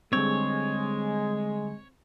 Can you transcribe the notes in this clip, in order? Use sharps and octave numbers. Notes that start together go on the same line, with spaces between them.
D3 G3 G#3 C4 C#5